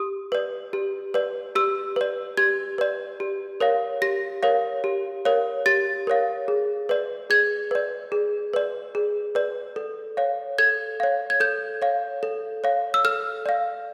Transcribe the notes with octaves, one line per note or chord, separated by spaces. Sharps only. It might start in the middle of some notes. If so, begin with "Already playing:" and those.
Already playing: G4 D#6
B4 D5
G4
B4 D5
G4 E6
B4 D5
G4 G#6
B4 D5
G4
A#4 C#5 F5
G4 A#6
A#4 C#5 F5
G4
A#4 C#5 F5
G4 A6
A#4 C#5 F5
G#4
B4 D5
G#4 G#6
B4 D5
G#4
B4 D5
G#4
B4 D5
A4
C#5 F5
A4 G#6
C#5 F5
G#6
A4 G6
C#5 F5
A4
C#5 F5
E6
A4 F6
D5 F5